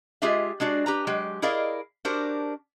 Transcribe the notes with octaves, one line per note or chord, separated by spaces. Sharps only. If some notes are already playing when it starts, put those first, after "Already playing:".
G#3 F4 G4 G#4 D#5 E5
G#3 D4 F#4 D5
G4 B4 A#5
F#3 G#3 G4
E4 G#4 A#4 D5 D#5 F5
D4 F#4 G4 A#4 C5